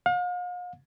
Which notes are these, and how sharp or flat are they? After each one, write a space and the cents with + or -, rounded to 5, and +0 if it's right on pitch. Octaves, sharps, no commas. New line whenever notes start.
F5 +40